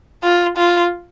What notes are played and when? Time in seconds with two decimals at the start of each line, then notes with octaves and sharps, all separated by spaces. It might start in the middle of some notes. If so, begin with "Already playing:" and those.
0.23 F4
0.57 F4